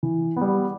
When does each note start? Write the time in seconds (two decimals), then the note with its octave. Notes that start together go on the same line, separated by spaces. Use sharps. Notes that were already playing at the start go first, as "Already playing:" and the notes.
0.03 E3
0.36 G3 B3